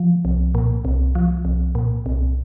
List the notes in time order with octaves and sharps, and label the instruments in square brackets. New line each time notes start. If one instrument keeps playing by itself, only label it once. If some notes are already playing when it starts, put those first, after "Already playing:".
Already playing: [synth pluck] F3
C2
A#2
C2
F3
C2
A#2
C2